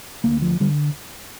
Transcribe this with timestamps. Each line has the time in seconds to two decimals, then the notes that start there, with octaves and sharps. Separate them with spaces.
0.24 D2 A#3
0.42 F3
0.60 D3 G3